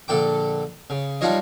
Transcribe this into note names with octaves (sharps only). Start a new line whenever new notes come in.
A#1 D3 A4 G5 D6
C#3
G3 D4 D#4 F4 C#5 D#5